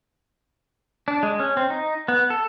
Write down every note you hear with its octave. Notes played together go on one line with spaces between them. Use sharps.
D4
G#3
C#4
C4
D#4
B3
A4